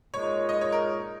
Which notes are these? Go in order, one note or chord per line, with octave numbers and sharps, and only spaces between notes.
A#2 G#3 D#4 C#5
D#5
C#5
A#4